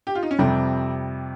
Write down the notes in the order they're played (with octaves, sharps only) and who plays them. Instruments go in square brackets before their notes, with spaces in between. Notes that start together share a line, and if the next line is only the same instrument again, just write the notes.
[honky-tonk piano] G4
F4
D#4
C#4
[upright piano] F2 C3 G3 [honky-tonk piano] C4